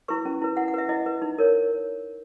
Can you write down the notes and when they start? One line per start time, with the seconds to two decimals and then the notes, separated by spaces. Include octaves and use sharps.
0.08 E4 B4 C#6
0.25 C#4
0.42 E4 B4
0.57 E4 F#5
0.68 F#5
0.74 B4 E5
0.89 E4 D#5
1.06 B4
1.22 D#4
1.39 A#4 C#5